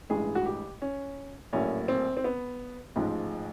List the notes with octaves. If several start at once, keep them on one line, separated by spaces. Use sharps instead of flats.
A1 G2 E3 G#3 G#4
F#4
G4
C#4
A#1 A2 F#3 A#3 C#4
C4
C4
B3
A1 G#2 F3 G#3